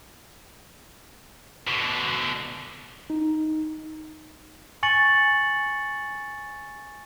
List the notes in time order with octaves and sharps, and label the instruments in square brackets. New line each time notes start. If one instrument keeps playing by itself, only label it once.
[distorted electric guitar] B2 D3
[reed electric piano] D#4
[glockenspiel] G#5 C#6 A6 C#7 F#7